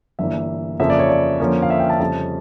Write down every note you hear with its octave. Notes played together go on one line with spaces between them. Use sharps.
G1 G2 E3 A#3 E5
F2 C#3 F3 A#3 E5
D5
C#5
D5
F2 D3 F3 A#3 C#4
F5
E5
G5
A5
F2 C#3 G3 C#4 A5